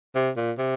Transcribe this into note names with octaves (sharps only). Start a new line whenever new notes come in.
C3
A#2
C3